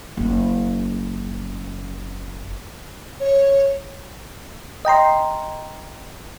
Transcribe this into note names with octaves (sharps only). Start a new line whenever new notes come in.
F#1 C#4
C#5
D#5 G5 A#5 C6